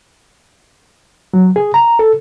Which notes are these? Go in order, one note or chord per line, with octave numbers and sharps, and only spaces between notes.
F#3
G#4
A#5
A4